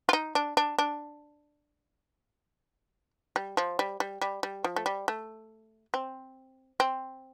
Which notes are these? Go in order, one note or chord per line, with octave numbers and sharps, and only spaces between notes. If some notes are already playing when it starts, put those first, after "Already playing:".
F4
D#4
D4
D4
D4
G3
F3
G3
G3
G3
G3
F3
A3
G3
A3
C4
C4